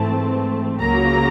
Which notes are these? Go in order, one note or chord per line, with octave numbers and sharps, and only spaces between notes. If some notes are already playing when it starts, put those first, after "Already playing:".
Already playing: G#2 E3 A3 C4 A5
C#2 C#3 F#3 A#3 A#5